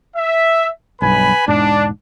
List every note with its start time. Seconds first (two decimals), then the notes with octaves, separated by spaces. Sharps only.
0.16 E5
1.02 B1 G2 B4 G#5 B5
1.47 E1 G#2 D4